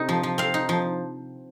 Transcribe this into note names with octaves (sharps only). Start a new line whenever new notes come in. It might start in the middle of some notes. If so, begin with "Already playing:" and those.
Already playing: C3 C4 D#4
F3
F3
C4 F5
D#4
F3